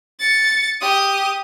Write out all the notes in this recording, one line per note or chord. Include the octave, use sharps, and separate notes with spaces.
A6 C#7
G4 D#6